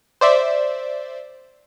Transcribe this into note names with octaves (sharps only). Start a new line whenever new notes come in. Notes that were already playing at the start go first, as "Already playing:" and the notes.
C5 D5 E5